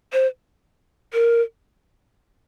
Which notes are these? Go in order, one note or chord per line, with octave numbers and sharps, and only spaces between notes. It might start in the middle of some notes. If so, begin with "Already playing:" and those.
C5
A#4